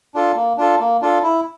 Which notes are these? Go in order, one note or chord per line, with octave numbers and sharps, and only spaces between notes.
D4 F4 A4
A#3
D4 F4 A4
A#3
D4 F4 A4
E4